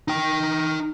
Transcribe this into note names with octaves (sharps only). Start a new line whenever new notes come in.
D#4 G5